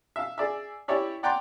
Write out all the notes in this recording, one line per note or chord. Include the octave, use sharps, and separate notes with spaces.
E5 F5
G#4 D5 E5
E4 G4 C#5 D5 E5
D5 F#5 G5 A#5 C6 D6